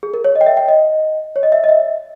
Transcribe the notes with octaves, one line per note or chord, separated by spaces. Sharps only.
G#4
A#4
C#5
D#5
G5
E5
G5
D#5
C#5
D#5
E5
D#5
E5